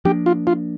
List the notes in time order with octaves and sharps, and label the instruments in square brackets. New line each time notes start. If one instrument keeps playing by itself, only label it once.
[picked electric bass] F3 A#3 D4 [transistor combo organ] G4
[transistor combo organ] F4
F4